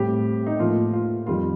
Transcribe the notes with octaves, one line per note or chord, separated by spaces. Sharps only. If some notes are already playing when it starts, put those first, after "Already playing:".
Already playing: A2 G3 C4 G4
D#4
A2 F3 A#3 F4
F4
F2 D#3 G3 F4